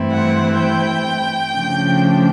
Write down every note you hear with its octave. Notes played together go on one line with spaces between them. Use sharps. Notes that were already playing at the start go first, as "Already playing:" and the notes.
Already playing: G2 E3 A3 C4 E4
F#5
G5
C#3 F3 A3 D4